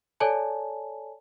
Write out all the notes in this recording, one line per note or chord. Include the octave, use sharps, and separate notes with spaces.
A4 C#5 D5 G#5 A5